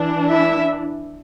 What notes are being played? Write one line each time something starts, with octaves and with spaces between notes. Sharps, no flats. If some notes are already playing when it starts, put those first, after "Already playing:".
Already playing: E3 D4
E4 E5